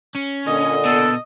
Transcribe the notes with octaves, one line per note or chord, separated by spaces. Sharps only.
C#4
A#2 D3 D#5
B2 A4